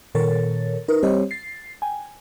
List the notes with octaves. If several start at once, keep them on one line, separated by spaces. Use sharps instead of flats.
A#2 D#3 A4 A#4 C#5 A6
D#4 A#4 B4
G3 C4 G4 C5 C#5 D#5
A6 C7
G5 G#5